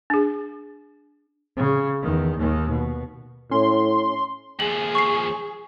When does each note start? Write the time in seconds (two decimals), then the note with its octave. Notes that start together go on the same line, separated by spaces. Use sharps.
0.10 D4 G#4
1.57 C#3
2.03 E2 D#3
2.37 D#2 D#3
2.70 B2
3.51 A2 C#4 C6
4.60 D#2 F3 G#4 F#7
4.95 C#6 C7